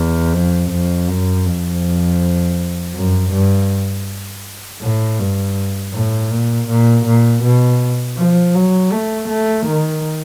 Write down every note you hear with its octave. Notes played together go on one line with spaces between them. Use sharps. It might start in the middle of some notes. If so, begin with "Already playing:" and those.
Already playing: E2
F2
F2
F#2
F2
F#2
G2
A2
G2
A2
A#2
A#2
A#2
B2
F3
F#3
A3
A3
D#3